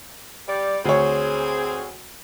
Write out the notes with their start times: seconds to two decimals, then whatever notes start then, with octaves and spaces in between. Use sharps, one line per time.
0.48 G3 D5
0.85 D2 C4 G#4 C#5